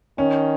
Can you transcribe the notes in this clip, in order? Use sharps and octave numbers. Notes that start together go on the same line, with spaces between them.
D#3 C#4